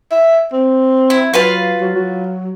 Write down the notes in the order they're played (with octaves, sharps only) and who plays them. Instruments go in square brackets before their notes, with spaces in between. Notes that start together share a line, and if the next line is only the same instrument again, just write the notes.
[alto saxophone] E5
C4
[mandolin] E4
[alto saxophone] F#3 [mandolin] F4 B4 F5
[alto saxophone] F#3
F#3